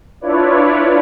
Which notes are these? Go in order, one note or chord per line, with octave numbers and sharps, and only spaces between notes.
D4 E4 F4 B4 C#5 D5